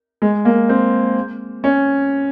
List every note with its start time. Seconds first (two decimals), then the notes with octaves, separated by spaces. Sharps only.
0.22 G#3
0.45 A#3
0.69 C4
1.64 C#4